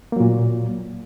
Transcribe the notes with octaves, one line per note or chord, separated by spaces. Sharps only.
A#2 F#3 A#3